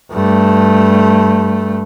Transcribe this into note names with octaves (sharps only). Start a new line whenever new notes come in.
G2 A3